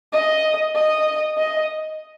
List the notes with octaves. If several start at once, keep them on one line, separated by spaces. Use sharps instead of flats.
D#5
D#5
D#5